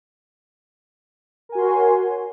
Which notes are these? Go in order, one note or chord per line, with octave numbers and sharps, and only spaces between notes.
F#4 A#4 C#5 G#5 C6